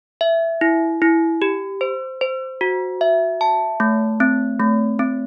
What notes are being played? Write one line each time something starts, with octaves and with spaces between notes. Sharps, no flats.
E5
E4
E4
G4
C5
C5
F#4
E5
A5
A3
C4
A3
C4